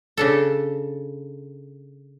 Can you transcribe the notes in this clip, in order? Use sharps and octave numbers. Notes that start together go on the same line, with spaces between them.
C#3 D4 A4